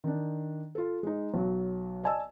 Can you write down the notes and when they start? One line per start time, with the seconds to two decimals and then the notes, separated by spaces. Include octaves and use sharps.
0.04 D#3 D4
0.75 F4 A4
1.03 G#3 D#4
1.34 B1 F#3
2.03 D5 D#5 G#5 A5 E6